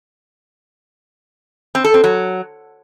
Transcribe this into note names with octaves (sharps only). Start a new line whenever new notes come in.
C4
A4
C4
F#3